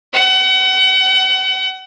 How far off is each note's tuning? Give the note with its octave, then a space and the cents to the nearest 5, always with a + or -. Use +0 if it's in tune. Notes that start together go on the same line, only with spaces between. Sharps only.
F#5 +35